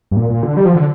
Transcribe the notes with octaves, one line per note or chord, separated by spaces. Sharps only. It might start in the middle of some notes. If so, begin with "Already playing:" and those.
G2
A#2
A#2
D3
G3
F3
D3